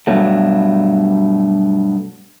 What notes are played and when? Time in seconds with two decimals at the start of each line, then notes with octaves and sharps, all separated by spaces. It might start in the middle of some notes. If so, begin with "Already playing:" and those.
0.07 G2 B2 F#3 A3